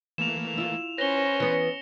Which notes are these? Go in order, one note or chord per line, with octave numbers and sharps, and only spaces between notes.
E3 A3 A#3 E7 F7
E4 F4
C#4 B4 C5 A#6 G7
E3 B3 C#7